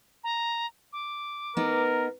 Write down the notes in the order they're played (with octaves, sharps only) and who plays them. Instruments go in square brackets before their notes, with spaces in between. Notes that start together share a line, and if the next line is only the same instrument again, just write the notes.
[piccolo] A#5
D6
[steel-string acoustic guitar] B3 D#4 [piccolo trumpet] A#4